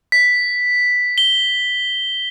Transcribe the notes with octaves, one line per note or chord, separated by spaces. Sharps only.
B6
G7